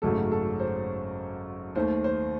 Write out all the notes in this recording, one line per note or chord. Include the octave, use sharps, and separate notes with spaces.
G#1 F#2 C#3 F#3 A3 A4
A4
C5
D#2 D#3 A3 C5
C5